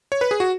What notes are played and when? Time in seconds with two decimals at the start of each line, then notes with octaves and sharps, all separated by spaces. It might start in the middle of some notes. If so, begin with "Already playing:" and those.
0.12 C#5
0.21 B4
0.31 G#4
0.40 F#4